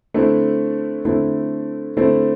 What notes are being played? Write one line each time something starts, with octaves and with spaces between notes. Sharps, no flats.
D3 A3 C4 E4
D3 A3 C4 E4
D3 A3 C4 E4